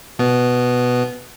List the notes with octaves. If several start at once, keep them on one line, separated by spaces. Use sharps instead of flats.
B2 B3